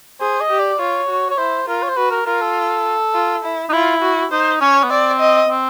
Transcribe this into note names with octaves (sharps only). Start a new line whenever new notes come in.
G#4 C5
D#5
G4
D5
F4 C#5
F#4
C#5
E4 C5
F4 A#4
C#5
C5
F#4 B4
A#4
F4 A#4
A4
F4
E4
D#4
E4 F4
F#4
D#4 C5
C#4 C#5
B3
C4 D5
D#5
C4